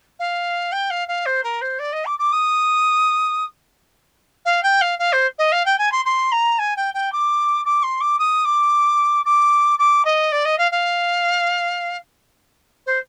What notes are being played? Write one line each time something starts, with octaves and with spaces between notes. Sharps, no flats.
F5
G5
F5
F5
C5
A#4
C5
D5
D#5
D6
D6
D#6
F5
G5
F5
F5
C5
D#5
F5
G5
G#5
C6
C6
A#5
G#5
G5
G5
D6
D6
C6
D6
D#6
D6
D6
D6
D#5
D5
D#5
F5
F5
C5